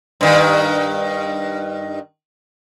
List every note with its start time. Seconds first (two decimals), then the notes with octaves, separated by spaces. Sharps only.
0.21 G2 D#3